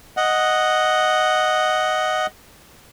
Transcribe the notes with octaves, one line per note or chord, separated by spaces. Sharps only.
D#5 F#5